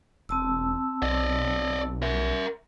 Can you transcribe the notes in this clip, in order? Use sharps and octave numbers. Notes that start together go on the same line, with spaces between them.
E1 C4 A5 E6
B1 D5 D#5
A#4 E5